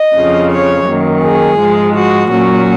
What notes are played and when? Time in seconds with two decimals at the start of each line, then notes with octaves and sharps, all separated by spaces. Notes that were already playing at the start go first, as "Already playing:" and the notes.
Already playing: D#5
0.14 F2 C#3 F3
0.51 C#5
0.87 F#2 D#3 A#3
1.23 G#4
1.59 G#2 F3 G#3
1.94 F#4
2.31 A#2 F#3 C#4 F#4